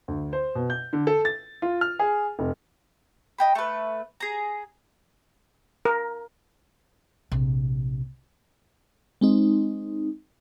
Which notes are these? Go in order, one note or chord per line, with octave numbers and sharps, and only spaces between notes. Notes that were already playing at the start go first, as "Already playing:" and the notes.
D2
C5
B2
G6
D3
A4
A6
F4
F6
G#4
F1
D#5 G5 B5
A3 B4
G#4 A#5
A#4
A#1 C3
G#3 C4 D#4